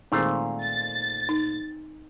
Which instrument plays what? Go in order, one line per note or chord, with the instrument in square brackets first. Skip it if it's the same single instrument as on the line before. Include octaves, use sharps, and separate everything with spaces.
[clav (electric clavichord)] A#2 A3 F5 [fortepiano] D#3 G#3 C4
[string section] A6
[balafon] D#4